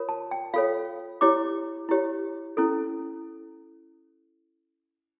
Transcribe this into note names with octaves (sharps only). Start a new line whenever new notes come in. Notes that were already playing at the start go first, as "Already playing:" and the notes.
Already playing: F4 A#4 C#5
A5
G5
F4 A4 C#5 F5
E4 G4 C#5 D6
E4 G4 C#5
C#4 E4 A4